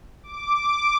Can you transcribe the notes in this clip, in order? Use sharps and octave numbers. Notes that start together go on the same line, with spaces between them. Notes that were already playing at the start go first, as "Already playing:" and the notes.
D6